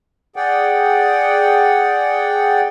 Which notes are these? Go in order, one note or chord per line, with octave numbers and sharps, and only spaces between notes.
G#4 D5 F#5 G5